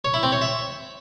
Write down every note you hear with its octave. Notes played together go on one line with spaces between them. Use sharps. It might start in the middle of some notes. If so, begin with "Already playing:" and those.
C#5
E4
C4
C#5
E5